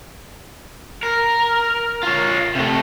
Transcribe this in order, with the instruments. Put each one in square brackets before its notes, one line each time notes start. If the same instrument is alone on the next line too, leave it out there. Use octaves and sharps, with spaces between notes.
[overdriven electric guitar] A#4
F4 C#5
C3 A3